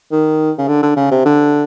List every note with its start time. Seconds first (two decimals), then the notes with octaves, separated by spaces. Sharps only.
0.12 D#3
0.58 C#3
0.68 D3
0.83 D3
0.97 C#3
1.11 C3
1.25 D3